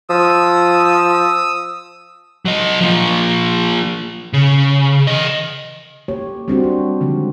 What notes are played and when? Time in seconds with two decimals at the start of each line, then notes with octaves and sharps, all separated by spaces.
0.10 F3 D#6 E6
2.45 F#3 D#5
2.81 F3 A#3
4.33 C#3
5.07 E3 D#5
6.08 A#3 G4 C#5
6.48 G3 C4 D4 F#4
6.64 D4
7.01 D3 D#3 F3 G#3